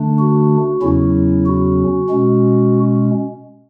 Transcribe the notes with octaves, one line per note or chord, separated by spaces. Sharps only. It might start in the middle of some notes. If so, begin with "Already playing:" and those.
Already playing: D3 A3 D4
F#4
E2 C#3 F#3 C#4 E4
F#4
B2 G#3 C#4